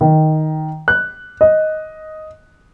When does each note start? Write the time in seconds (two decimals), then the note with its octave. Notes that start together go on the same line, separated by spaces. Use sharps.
0.01 D#3
0.88 F#6
1.41 D#5